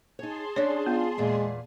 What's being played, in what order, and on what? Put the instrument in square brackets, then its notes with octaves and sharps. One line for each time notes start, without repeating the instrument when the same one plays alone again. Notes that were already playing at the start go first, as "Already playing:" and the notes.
[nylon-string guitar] D#4 C#5 [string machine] G#4 A5 C6
[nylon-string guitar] C#4 D4 [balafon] C#5 D5
[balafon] B3 [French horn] F4
[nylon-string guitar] E2 A#2 [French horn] G#3